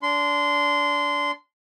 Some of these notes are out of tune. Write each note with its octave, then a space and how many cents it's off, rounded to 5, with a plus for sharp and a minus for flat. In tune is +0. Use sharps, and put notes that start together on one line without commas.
D4 -25 C6 -20